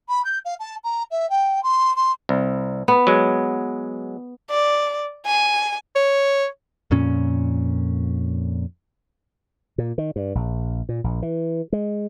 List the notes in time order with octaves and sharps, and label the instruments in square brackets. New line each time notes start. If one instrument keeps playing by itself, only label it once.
[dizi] B5
G6
F5
A5
A#5
E5
G5
C6
C6
[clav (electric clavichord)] C2
[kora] B3
[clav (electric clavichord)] F#3 G#3
[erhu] D5
G#5
[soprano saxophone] C#5
[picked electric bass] F2 A#2 C#4
[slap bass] A#2
D#3
G2
A#1
A#2
A#1
E3
G#3